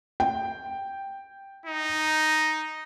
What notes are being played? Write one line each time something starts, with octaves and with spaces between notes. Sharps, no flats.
G5
D#4